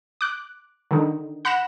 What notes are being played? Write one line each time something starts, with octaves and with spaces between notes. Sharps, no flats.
D6 F#6
D3 D#3 D#4
F#5 B5 F#6 A#6 E7